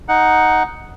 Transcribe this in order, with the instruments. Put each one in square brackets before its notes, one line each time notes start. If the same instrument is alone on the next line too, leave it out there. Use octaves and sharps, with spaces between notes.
[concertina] D#4 F#5